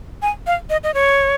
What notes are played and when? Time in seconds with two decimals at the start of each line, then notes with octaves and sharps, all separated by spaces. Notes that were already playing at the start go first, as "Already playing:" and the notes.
0.22 G#5
0.47 F5
0.70 D#5
0.84 D#5
0.94 C#5